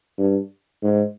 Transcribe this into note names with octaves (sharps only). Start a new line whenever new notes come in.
G2
G#2